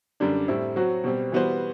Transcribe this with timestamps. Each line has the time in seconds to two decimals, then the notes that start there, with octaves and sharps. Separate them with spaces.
0.20 F#2 D3 G3 D4
0.48 A2 G3 C4 E4
0.76 F#3 C4 F#4
1.04 B2 G3 C4
1.32 E3 G3 B3 F#4 C5